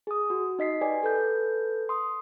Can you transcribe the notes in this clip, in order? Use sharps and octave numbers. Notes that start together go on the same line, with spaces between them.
G#4 D#6
F#4
D#4 D#5 B6 C7
G4 B4 D5 G#5
A4 B4 G6
C6 D#6